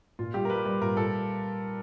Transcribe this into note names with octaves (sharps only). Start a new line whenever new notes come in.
A#2 F4
G3 G4
A#4
G3 B4
G3 B4
A#2 A#4
A#2 A4